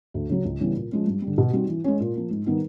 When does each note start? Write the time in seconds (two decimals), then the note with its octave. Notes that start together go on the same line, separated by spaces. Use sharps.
0.14 D2
0.30 C#3 F#3
0.45 C#2
0.60 C#3 E3 G3 B3
0.76 A#2
0.92 F3 G#3 C#4
1.07 G2
1.22 G3
1.27 D3
1.38 B2
1.53 G3 C4 D#4 F#4
1.69 E3
1.84 G#3 C#4
2.00 A#2
2.15 F3 A#3
2.31 G#2
2.46 D#3 G3 B3 D#4